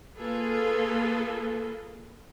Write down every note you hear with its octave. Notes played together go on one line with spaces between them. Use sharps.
A#3 F4 G#4 A4 B4